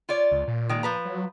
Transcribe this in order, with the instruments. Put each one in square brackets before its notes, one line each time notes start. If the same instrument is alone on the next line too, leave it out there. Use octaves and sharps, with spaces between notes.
[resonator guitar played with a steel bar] F4 C#5 D5
[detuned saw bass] C#2
A#2
[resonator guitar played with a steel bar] D#3 G3 G#3
F3 B4 A#5
[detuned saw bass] F#3